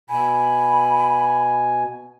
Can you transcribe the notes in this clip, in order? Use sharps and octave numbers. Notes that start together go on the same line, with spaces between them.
B2 G#5 B5